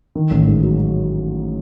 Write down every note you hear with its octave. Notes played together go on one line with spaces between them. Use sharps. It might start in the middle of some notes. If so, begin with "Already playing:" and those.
D#3
A1
G#2
F#3